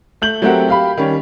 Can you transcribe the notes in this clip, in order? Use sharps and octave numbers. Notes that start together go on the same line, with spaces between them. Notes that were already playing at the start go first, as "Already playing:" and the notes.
A3 G6 F#7
F#3 A3 C4 G4 A#4 F#5
G4 F5 B5
D#3 G3 C#4